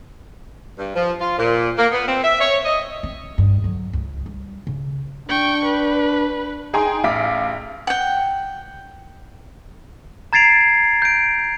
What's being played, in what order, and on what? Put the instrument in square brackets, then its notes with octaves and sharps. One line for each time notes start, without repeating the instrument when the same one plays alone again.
[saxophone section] G2
F3
F4
A#2
A#3
B3
C4
E5
C#5
D#5
[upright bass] C4
G2
D3 F#3
C#2
G3
C#3
[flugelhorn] D4 [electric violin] G5 C#6
[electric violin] B4
[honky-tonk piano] D#4 G#4 G5 G#5 A#5 C6
A1 F5 D6 B6 D7
[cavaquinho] F#5 G5
[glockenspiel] A#5 G#6 A6 C7 D7 F7
G6 D7